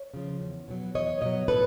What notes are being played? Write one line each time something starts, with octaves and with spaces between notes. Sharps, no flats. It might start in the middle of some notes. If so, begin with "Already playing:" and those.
Already playing: C#5
C#3 F3
E2
B2 F#3
E2 C#5 D#5
B2 F#3 C#5 D#5
A2 A4 B4